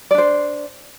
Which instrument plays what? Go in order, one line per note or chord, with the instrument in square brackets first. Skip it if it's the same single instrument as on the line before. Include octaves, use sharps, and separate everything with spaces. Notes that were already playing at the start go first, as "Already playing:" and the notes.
[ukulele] D5
D4
C5